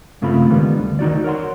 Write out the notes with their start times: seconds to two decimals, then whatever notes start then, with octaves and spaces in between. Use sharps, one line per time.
0.22 G2 C#3 A3 C4 F4 B5
0.50 D3 D#3 G3 G#3 B3
0.78 D2
0.99 D#3 D#4 F#4 D5
1.24 A#4 C#5 F#5 C6